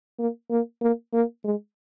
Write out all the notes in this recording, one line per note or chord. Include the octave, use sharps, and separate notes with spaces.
A#3
A#3
A#3
A#3
G#3